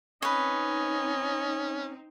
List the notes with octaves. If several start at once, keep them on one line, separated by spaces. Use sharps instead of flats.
C4 C#4 D#4 B4 C#5 D#5